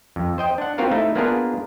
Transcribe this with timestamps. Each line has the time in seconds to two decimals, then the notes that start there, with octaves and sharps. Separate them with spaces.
0.16 F2
0.38 C5 D#5 G5
0.58 D4 F#5
0.78 B3 C4 F4 F#4 A#4 F5
0.91 A3 D#4 E4
1.15 A#3 B3 D4 F4 G#4 A#4